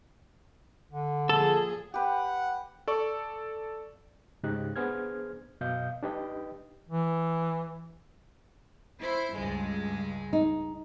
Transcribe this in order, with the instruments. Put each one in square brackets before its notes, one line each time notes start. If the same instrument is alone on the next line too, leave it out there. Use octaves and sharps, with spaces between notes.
[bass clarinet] D3
[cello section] A#2 F3 G#4 [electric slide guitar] A4
[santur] G4 B4 [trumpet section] F#5
[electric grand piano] A4 D5 C#6
[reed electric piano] C#2 G#2 C#3 D#4 G4 F#6
B3 D4 G#4 C5 F6 G#6
F#2 B2 D#5 F5 G6
D4 D#4 G4 B4 D#5 G5
[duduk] E3
[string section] E4 C5
C#2 G2 G#3
[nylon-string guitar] D#4